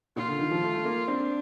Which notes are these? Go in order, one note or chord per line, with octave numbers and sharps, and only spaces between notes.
A#2 F4
D3
D#3
F3
A3
A3
A#3
C4 D4